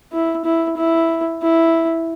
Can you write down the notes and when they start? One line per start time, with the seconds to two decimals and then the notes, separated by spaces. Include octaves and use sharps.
0.12 E4
0.45 E4
0.77 E4
1.42 E4